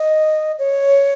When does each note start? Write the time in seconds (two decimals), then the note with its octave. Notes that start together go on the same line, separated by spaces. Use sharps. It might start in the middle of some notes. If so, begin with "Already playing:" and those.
Already playing: D#5
0.59 C#5